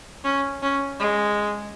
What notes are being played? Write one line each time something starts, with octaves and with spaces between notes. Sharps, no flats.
C#4
C#4
G#3